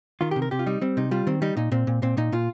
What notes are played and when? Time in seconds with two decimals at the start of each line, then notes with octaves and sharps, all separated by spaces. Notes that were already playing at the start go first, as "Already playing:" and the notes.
0.21 D#3 F4
0.31 C3 G4
0.42 A#4
0.51 C3 G4
0.59 F4
0.66 G3 D#4
0.81 G3 C4
0.97 C3 D#4
1.11 G3 F4
1.27 D#3 C4
1.42 G3 D#4
1.57 A#2 D#4
1.72 A#2 C4
1.87 A#2
2.02 A#2 C4
2.17 A#2 D#4
2.32 A#2 F4